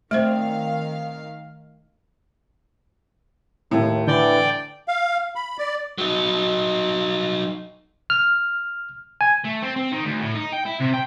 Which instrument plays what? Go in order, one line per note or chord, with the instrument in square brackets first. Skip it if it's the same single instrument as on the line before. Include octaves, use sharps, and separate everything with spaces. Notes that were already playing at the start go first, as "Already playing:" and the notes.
[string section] D#3 F5 [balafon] A3 C5 [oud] C4 D5
[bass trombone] D#2 [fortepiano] A2
[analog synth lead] D3 [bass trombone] E3 [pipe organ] D5 G5
[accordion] F5
B5
D5
[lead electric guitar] F#3 D#4
[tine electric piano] F6
G#5
[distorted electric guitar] A3
C4
C4
D#3
D2
A2
D#4
G5
E4
C3
G5